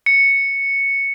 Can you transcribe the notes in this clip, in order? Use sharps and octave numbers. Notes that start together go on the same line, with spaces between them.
C#7